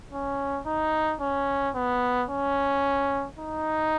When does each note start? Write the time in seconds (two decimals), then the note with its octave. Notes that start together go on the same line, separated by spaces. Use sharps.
0.12 C#4
0.66 D#4
1.21 C#4
1.75 B3
2.30 C#4
3.39 D#4